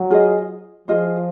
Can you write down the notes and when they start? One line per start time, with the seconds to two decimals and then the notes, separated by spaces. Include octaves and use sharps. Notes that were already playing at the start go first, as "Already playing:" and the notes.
Already playing: F#3
0.10 F4 G#4 C5 D#5
0.88 F3 F4 G#4 C5 D#5